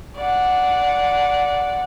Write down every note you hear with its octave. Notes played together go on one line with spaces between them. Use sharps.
D5 F#5